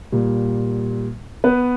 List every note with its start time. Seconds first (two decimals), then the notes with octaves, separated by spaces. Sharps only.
0.12 A#2 G3
1.44 B3 B4